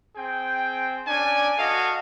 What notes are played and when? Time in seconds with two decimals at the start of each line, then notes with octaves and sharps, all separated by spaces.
0.16 C4 G#4 G5
1.07 C#4 D4 D5 G#5
1.58 F#4 A4 D#5 F5